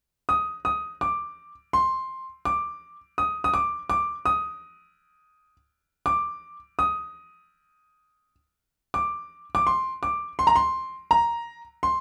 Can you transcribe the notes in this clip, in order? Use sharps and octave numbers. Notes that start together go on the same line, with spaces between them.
D#6
D#6
D6
C6
D6
D#6
D#6
D6
D6
D#6
D6
D#6
D6
D6
C6
D6
C6
A#5
C6
A#5
C6